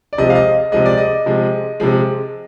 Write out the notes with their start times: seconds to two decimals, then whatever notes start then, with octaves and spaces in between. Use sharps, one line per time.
0.13 D5
0.18 C3 F3 G#3 D#5
0.30 F5
0.35 D#5
0.72 C3 F3 G#3 D#5
0.86 D5
0.98 D#5
1.26 C3 F3 G#3
1.80 C3 F3 G#3